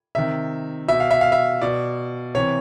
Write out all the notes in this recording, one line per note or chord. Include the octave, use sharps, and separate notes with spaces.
C3 D#3 E5
B2 E5
F5
E5
F5
E5
B2 D5
C3 E3 C#5